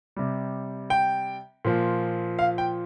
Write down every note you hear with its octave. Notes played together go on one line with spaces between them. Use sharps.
C3 G3
G5
A#2 F3
F5
G5